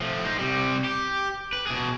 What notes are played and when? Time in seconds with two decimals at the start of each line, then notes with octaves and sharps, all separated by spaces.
0.01 F3 A3
0.25 D#4 C5
0.39 C3 G3
0.84 G4
1.53 B4
1.67 B2 G#4